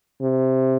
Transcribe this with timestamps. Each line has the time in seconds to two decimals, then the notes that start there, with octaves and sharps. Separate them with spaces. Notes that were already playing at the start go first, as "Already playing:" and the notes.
0.21 C3